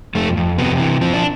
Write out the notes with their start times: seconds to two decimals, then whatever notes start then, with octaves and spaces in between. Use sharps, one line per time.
0.15 F2 A3
0.37 F2
0.58 C3 B3
0.80 E3
1.01 F3 C4
1.13 D4